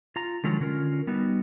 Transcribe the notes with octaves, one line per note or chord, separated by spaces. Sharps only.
F4 A#5
D3 D#3 F3 F#3 G#3
D3 C#4 F4 A#4
G3 B3 D#4 F#4